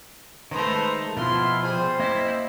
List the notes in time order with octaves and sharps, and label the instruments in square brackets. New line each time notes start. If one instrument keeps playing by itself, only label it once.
[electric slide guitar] D#3 G#3 [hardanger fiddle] A3 A#5 [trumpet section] B4 C5
[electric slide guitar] B2 F3 [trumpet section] E4 F4 [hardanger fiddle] C6
[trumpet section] G3 C5 [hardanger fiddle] G#4
[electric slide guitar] A#3 D#5 E5 [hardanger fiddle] E4